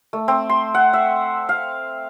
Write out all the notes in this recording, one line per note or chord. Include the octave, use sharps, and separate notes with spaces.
A3
C4
C6
F#5
E5
F5